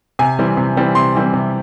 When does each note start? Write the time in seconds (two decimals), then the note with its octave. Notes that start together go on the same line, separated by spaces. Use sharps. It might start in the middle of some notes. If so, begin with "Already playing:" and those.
0.19 C3 G#5
0.39 E3 G3 C4
0.57 C3
0.77 E3 G3 C4
0.95 C3 C6
1.15 E3 G3 C4
1.34 C3